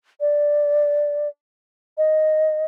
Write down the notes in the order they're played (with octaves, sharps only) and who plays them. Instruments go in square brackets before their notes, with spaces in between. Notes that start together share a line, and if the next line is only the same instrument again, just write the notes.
[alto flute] D5
D#5